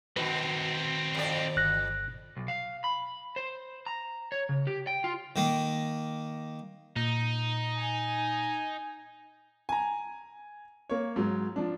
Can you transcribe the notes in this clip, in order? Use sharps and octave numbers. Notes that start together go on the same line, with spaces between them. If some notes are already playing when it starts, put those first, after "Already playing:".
B2 D#3 C4 D#4 F#4 B4
F2 D5
G1 F#6 A#6
B1
F5
B5
C5
A#5
C#5
C#3
G4
G5
F4
D#3 A#3
A#2 D#4
G#5
G#5 A#5
A#3 C#5
G#2 F#3
F3 D4